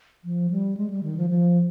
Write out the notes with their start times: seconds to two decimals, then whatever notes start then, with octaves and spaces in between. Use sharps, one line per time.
0.24 F3
0.51 G3
0.77 G#3
0.90 G3
1.03 D#3
1.17 F3
1.30 F3